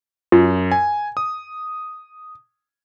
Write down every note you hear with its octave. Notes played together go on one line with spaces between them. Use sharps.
F#2 F4
G#5
D#6